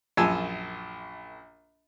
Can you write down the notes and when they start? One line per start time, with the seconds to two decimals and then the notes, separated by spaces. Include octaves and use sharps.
0.17 A#1 F#2 F4 G#5 A5 E6